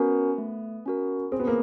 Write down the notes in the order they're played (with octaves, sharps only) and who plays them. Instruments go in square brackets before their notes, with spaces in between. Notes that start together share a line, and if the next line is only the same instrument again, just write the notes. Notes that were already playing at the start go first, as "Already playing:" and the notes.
Already playing: [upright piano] B3 [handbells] C#4 F#4 A#4
[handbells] A3
C#4 F#4 A#4
[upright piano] C4 [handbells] G#4
[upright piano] B3
A#3